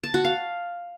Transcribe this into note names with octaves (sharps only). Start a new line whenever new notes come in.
A5
F#4
F5